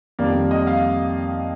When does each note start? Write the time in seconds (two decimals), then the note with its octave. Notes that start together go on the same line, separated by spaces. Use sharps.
0.19 F2 D#3 G3 A#3 D5
0.51 D#5
0.67 F5